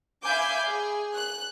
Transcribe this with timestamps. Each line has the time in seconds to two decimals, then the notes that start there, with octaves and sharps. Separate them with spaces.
0.25 E5 F5 G#5 B5 D6 G6
0.66 G#4
1.17 F#6